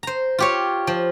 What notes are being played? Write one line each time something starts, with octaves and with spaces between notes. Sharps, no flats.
C5 A#5
F4 G4 C#5
F3